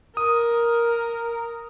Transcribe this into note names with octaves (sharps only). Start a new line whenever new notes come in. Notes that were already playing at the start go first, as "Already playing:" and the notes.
A#4 D#6